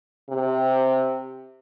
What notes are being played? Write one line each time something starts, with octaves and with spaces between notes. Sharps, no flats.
C3